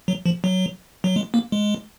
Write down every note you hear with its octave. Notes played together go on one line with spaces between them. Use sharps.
F#3
F3
F#3
F#3
G#3
A#3
G#3